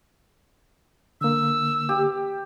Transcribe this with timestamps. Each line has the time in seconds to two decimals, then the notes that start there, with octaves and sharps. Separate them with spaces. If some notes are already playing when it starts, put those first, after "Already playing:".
1.21 D3 A#3 E6
1.89 G4